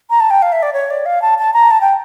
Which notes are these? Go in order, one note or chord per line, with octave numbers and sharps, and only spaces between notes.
A#5
A5
G5
F5
E5
D5
C#5
D5
F5
A5
A5
A#5
A5
G5